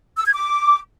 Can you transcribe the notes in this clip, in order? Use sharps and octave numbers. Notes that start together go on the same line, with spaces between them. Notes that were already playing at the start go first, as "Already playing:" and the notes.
E6
G#6
D6